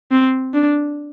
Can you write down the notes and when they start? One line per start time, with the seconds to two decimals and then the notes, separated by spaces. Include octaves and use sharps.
0.12 C4
0.54 D4